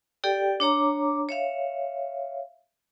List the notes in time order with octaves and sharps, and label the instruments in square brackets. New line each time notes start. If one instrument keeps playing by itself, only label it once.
[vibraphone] G4 A4 D5 G5
D4 C#5 A#5 D6
C#5 E5 F5